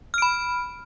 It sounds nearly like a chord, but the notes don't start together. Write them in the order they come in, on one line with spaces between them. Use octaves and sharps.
F6 D7 B5